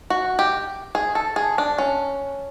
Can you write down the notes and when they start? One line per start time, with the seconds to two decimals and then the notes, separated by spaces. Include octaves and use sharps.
0.10 F#4
0.39 G4
0.95 G#4
1.15 A4
1.36 G#4
1.58 D4
1.78 C#4